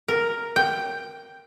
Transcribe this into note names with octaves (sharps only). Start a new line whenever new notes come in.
A#4
G5